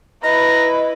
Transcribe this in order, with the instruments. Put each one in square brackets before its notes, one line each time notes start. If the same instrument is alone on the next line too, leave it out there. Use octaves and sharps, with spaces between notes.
[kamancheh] E4 B4 [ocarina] D#5 [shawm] A#5